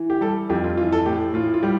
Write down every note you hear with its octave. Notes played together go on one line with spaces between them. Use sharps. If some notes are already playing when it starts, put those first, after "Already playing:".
Already playing: E3
G4
G3 A4
F2 G4
F4
E3 F4
A4
A2 G4
A2 F4
F4
G3 G4